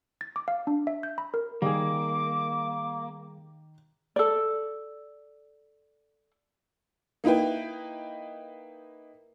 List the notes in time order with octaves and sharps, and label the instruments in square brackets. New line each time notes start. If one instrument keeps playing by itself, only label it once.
[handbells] A6
D6
F5
D4
E5
G6
B5
A#4
[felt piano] D#3 [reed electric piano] G3 G#4 [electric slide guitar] A#3 [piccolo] D6
[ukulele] A4 D5
[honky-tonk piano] A#3 D#4 E4 B4 G5